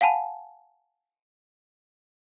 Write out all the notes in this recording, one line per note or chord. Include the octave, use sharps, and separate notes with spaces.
F5 F#5 G#5 A5 B5